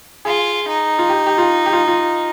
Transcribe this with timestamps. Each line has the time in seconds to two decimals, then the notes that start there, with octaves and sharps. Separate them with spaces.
0.25 F4 G#4
0.68 D#4
0.98 F4
1.09 G4
1.26 G4
1.38 F4
1.66 G4
1.73 F4
1.88 F4